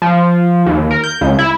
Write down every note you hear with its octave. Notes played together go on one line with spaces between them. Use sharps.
F3
D#2
A#4
G6
C#2
E4